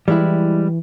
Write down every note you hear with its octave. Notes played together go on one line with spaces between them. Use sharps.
E3 G3 G#3 E4